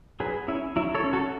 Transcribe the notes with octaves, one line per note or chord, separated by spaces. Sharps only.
F#3 G#4 B4
C#4 E4
F#3 E4
A4 C#5
C#4
F#4 A4